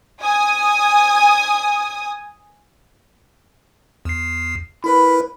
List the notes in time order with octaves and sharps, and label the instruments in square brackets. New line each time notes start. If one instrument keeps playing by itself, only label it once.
[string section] G#5 D#6
[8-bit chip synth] E2 C7
[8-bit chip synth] E4 A#4 B4 [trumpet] B5